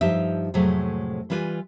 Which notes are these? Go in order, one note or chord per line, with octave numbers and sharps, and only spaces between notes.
G2 F3 D#4 G4 E5
F2 A2 C3 F#3 G#3 A3
E3 G3 F4 B4 G#5